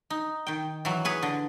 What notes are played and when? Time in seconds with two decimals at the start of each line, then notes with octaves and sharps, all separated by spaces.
0.10 D#4
0.47 D#3 G5
0.85 E3 F#3
1.05 G#4 B4 C#5
1.22 D3